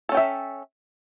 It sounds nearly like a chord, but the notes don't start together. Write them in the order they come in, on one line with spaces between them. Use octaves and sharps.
A4 C#4 G5 E5